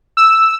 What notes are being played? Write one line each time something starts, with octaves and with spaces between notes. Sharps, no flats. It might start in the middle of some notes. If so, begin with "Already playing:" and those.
E6